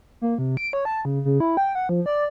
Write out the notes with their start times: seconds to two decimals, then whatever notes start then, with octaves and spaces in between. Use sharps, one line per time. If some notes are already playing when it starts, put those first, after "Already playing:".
0.21 A#3
0.38 C3
0.57 D7
0.73 C#5
0.85 A5
1.05 C#3
1.25 C#3
1.40 E4
1.57 G5
1.75 F#5
1.89 F3
2.06 D5